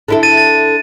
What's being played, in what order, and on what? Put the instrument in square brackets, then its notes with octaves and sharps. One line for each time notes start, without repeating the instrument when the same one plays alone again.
[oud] D3 E4 A4
[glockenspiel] A6 D#7
A6